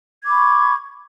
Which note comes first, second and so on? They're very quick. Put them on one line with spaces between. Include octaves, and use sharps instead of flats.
G#6 D6 B5 C#6